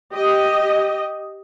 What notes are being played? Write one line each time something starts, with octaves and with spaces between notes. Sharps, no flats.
G4 D#5